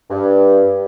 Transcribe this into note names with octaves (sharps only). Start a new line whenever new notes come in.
G2